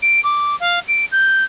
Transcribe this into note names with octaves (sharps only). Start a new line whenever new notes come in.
D7
D6
F5
D7
G6